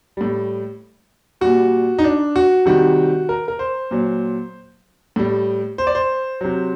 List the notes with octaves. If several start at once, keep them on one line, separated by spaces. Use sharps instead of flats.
A2 G3
A#2 G3 F#4
D#4
D4
F#4
C3 D#3 G3 F#4
A#4
A#4
C5
A#2 F#3
A2 G3
C5
D5
C5
C3 F#3